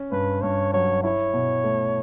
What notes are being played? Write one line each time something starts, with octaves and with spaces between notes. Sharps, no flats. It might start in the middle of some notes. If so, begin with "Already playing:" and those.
Already playing: C#4
G2 B4
G2 C#5
F#3 C#5
E4 C#5
B2
A3